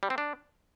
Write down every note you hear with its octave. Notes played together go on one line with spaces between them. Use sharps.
G3
C4
D4